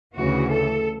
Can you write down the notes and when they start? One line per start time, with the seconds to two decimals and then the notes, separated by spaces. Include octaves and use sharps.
0.14 D2 C#3 E3 F#4
0.49 A4